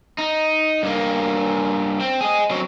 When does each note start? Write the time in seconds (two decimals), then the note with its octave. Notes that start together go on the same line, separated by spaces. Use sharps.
0.18 D#4
0.83 G2 A#3
2.01 C4
2.21 G#4 D#5
2.50 F#3 C4